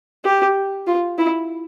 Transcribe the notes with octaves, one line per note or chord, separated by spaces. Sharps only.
G4
F4
E4